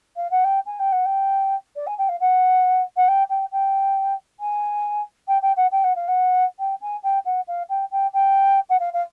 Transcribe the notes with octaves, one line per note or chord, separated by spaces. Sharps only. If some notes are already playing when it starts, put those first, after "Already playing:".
F5
F#5
G5
G#5
G5
F#5
G5
D5
G#5
G5
F5
F#5
F#5
G5
G5
G5
G#5
G5
G5
F#5
G5
F#5
F5
F#5
G5
G#5
G5
F#5
F5
G5
G5
G5
F#5
F5
F5